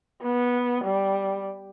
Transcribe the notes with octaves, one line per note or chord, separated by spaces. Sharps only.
B3
G3